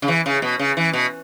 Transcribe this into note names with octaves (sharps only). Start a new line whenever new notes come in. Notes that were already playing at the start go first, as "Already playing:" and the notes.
C#3
E3
C#3
B2
C#3
E3
B2